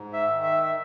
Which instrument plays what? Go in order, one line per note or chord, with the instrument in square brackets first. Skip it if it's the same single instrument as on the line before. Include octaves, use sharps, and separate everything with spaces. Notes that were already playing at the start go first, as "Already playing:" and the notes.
Already playing: [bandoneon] G#2
E5
D#3
E5
E5